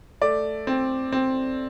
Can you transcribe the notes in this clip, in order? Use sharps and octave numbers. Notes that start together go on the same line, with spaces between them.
A3 D5
C4
C4